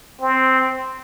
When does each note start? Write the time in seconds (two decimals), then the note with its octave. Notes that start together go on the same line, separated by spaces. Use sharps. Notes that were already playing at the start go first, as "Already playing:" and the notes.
0.21 C4